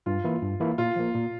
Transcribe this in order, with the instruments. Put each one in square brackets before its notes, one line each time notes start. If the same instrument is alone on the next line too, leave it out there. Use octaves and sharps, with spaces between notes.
[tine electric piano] G2 [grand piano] F4
[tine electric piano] E3 A#3 E4
G2
E3 A#3 E4
[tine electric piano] A#2 [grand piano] F4
[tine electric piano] F3 A#3
A#2